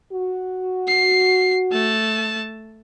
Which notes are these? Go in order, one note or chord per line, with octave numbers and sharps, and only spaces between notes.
F#4
C7
A3 A5